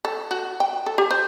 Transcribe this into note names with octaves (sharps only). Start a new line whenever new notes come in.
A4
F#4
G5
A4
G4
C5